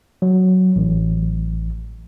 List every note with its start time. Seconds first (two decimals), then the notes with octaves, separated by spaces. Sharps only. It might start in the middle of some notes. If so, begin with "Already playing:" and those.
0.22 F#3
0.76 A1